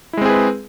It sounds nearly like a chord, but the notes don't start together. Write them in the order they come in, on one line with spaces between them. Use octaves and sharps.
E4 G#3 C4 G#4 B4